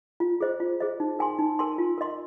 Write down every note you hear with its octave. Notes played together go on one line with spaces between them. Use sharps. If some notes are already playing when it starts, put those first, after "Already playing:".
F4
G#4 C5 D#5
F4
G#4 C5 D#5
D#4
A#4 G#5 C6
D#4
A#4 G#5 C6
F4
A#4 D#5 C6